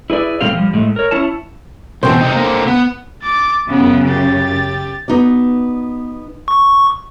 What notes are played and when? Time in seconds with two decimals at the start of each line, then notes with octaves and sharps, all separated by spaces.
0.10 E4 G#4 B4 D5
0.41 A#2 G3 A3 C4 G4 F5
0.54 F3 G3
0.73 A2 G#3
0.96 A#4 C#5
1.11 C#4 E4 C#5 A5
2.03 B2 E3 C4 C5
2.21 C3 D#4
2.35 D3 A#3
2.67 B3
3.22 D6 A6
3.70 F#2 C#3 B3
4.08 G4 A6
5.08 B3 D#4 F#4 D5
6.48 C#6